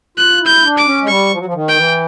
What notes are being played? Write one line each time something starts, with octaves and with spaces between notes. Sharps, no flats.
F4 F#6
E4
G6
D4
D6
C#4
G#3
G3 C#6
F3
F#3
F3
D#3
G5
E3